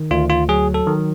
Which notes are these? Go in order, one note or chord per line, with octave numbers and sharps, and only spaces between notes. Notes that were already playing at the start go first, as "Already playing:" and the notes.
Already playing: D#3
D2 F4
F4
F#3 G#4
A4
D#3